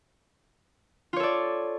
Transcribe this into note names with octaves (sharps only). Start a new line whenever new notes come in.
F4 A4 C#5 D5